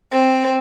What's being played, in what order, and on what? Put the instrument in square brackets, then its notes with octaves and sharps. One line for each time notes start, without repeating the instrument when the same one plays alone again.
[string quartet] C4